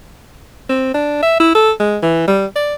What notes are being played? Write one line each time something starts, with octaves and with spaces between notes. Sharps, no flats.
C4
D4
E5
E4
A4
G#3
E3
G3
D5